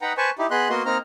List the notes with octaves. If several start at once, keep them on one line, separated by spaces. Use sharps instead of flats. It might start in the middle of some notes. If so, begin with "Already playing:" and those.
D#4 B4 F#5 G5 A#5
B4 C5 G#5 A5 C#6
D#4 E4 G4
B3 G#4 D#5 B5 C6 F#6
A#3 B3 F#4 D#5 C6
A#3 C4 D#4 A#5 F6